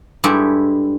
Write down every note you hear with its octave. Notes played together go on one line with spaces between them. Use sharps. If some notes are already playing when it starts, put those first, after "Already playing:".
G2 G#3 E4 G4 A4